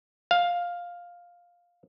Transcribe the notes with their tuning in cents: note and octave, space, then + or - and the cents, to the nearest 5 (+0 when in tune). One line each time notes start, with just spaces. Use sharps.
F5 +5